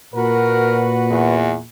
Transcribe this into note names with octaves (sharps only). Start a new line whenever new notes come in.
A#2 F#4 A#4 B4
E2